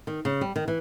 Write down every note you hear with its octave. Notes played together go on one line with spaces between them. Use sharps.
D#3
C#3
G3
D#3
E3